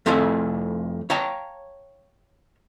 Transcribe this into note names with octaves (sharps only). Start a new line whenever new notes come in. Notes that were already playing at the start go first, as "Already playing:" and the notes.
F2 F3 A3 E4 G#4 F5
C#5 F5 G5 A5 A#5